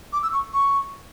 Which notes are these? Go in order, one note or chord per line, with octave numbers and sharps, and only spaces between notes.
D6
E6
C#6
C#6